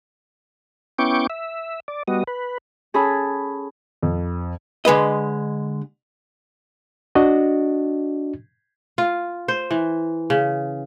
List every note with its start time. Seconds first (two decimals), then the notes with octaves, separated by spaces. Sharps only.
0.98 B3 C#4 E4 G5 C#6 D6
1.30 E5
1.88 D5
2.08 G3 B3 F#4 D#5
2.27 B4
2.94 C#4 G#4 A4 A5 B5
4.03 F2
4.85 D3 G#3 B4 D#5
7.15 D4 F#4 D#5
8.98 F4
9.48 C5
9.71 E3
10.30 C#3